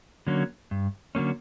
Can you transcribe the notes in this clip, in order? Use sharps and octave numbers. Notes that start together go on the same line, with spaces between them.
D3 F#3 A#3 C#4
G2
D3 F#3 A#3 C#4